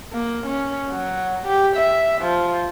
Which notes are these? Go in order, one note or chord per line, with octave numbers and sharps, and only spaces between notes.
A#3
C#4
F#3
G4
E5
F3